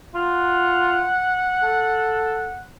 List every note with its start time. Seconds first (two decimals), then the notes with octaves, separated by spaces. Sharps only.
0.15 F4 F#5
1.63 A4